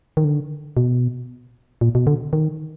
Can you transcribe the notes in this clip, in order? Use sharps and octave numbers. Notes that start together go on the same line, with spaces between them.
D#3
D3
B2
A#2
B2
D3
D#3